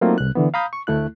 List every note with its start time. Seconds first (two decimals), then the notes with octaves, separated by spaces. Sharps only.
0.01 F#3 A3 A#3 C4 D#4 F4
0.18 C2 F#6
0.35 D3 E3 B3
0.54 F5 A#5 B5 D#6 G6
0.73 C#6
0.87 D2 A3 E4 F#6